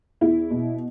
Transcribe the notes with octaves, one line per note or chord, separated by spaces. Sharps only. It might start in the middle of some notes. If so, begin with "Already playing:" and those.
E2 E4
B2